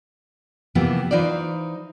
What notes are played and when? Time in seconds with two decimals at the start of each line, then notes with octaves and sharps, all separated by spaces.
0.75 C3 E3 F3 A#3 B3
1.11 E3 D#4 F4 C5 D5